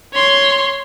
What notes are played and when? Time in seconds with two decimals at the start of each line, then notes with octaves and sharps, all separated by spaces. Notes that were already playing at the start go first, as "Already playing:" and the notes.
0.13 C#5 C6